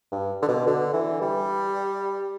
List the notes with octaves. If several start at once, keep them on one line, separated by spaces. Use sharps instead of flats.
G2
D3
B2
D3
E3
G3